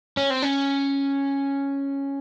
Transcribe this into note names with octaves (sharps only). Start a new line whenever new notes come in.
C#4
C4
C#4